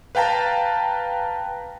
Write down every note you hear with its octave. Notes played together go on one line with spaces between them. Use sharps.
B4 F5 G5 A5 A#5